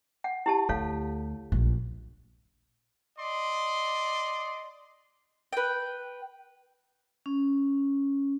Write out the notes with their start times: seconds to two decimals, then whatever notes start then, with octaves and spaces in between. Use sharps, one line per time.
0.24 F#5
0.46 E4 G4 A5
0.69 D2 A4 C#5 F5
1.52 A#1
3.18 D5 D#5 C6
5.53 B4 G5
7.26 C#4